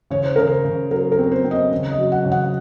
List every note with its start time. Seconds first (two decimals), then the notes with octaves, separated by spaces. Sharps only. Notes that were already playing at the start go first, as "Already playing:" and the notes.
0.10 C#3 C#5
0.23 C5
0.36 C#3 A#4
0.47 C5
0.64 C#3
0.90 F#3 A#4
1.12 A#4
1.18 C4
1.31 C5
1.44 C4
1.51 D#5
1.71 C#3
1.91 D#5
1.98 F#3
2.12 F#5
2.25 C#3
2.32 F#5